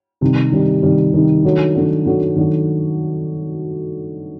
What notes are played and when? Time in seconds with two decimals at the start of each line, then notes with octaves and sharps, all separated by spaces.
0.21 C3 D#3 G3
0.52 C3 D#3 G3
0.83 C3 D#3 G3
1.14 C3 D#3 G3
1.44 D#3 F#3 A3 D4 F#4
1.75 D#3 F#3 A3 D4 F#4
2.06 D#3 F#3 A3 D4 F#4
2.36 D#3 F#3 A3 D4 F#4